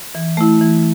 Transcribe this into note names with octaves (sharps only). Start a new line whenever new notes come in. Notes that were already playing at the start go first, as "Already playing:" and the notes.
E3
A3 E4
E3